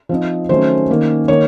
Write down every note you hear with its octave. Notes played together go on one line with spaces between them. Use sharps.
F3 C4 D#4
D#3 F#3 A3 C#4 C5
D#3 A#3 C#4
D#3 A#3 C#5